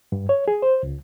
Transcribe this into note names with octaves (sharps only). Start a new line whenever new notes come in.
G2
C#5
G#4
C5
C#2